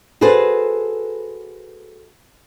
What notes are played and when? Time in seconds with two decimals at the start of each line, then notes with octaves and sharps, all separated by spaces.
0.21 F#4 G#4 A4 B4 C5